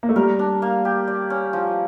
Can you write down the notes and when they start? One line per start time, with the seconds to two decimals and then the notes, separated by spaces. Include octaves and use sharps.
0.03 A#3
0.09 A3
0.16 G3 A#4
0.39 D4
0.62 A#3
0.85 G4
1.08 D5
1.30 C#4
1.53 F3